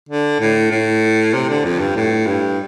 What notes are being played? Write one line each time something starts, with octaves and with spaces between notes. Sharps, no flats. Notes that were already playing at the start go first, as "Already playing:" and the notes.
D3
A2
A2
C3
D3
F2
G2
A2
G2